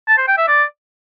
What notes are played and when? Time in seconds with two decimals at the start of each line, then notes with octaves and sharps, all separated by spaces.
0.08 A5
0.18 C5
0.28 G5
0.38 E5
0.48 D5